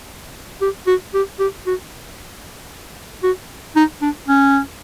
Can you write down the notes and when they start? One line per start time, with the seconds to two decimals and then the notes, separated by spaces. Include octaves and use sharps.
0.61 G4
0.87 F#4
1.14 G4
1.39 G4
1.67 F#4
3.23 F#4
3.76 D#4
4.02 D4
4.27 C#4